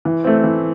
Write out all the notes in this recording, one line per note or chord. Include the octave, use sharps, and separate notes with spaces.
E3
A3 C4
E3